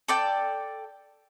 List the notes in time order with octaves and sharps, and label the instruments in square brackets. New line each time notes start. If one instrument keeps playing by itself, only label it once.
[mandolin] A4 D5 G5